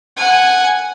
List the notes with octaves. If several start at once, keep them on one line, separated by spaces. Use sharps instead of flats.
F#5 G#5